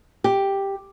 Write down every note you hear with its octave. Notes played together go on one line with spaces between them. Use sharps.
G4